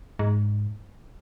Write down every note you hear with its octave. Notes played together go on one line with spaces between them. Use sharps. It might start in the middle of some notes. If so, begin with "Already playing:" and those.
G#2